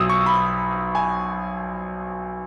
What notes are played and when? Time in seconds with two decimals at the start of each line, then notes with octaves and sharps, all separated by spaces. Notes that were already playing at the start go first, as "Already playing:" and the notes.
Already playing: B1 B2 F#3 D#6 E6
0.10 C#6
0.26 B5
0.95 G#5